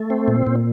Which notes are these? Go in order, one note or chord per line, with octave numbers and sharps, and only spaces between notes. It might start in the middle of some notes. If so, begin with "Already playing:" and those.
Already playing: A3
C4
A#2
A#2